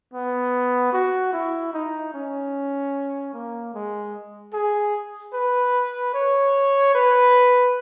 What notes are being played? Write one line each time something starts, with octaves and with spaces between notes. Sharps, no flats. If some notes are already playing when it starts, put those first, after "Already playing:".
B3
F#4
E4
D#4
C#4
A#3
G#3
G#4
B4
C#5
B4